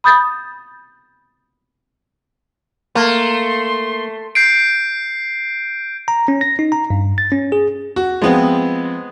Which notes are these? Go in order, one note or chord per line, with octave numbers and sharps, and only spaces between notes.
B5 D#6 G6 A6
A3 A#3 C6
G6 C7 D7
A#5
C#4
A#6
D#4
A#5
G2
A6
C#4
G#4
F#4
F3 G#3 B3 C4